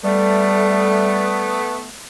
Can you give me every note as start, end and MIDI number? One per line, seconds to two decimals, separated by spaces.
0.04 1.74 55
0.04 1.86 57
0.04 1.86 59